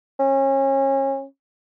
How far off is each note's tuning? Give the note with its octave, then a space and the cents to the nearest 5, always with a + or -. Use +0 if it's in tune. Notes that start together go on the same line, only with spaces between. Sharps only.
C#4 -30